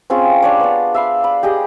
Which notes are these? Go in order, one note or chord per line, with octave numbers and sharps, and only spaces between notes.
C4 C#4 F4 G#4
D4 C#5 D5
B3 D4
E5 F5 B5
B5
G4 G#4 D#5